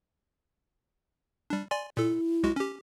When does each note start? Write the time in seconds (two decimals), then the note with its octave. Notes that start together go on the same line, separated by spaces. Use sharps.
1.50 G3 D4
1.71 D5 G#5 C6
1.97 A#2 E4 A4
2.43 B1 G#3 F#4
2.56 C#4 G4